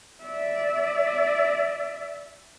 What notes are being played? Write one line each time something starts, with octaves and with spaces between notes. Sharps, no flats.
D5 E5